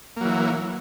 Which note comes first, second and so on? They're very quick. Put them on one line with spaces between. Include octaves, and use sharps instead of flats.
A#3 F#3 E3